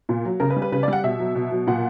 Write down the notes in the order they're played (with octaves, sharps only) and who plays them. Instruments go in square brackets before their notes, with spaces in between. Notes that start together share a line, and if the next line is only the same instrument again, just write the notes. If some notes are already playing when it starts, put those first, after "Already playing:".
[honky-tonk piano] A#2
F#3
C#3 A#4
B4
G3
B4
C#3 B4
D5
G3 F#5
B2 E5
F#3
B2
F#3
A#2 F#5